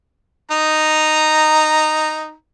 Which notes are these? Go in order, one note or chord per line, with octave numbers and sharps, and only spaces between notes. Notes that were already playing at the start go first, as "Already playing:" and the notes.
D#4 A#5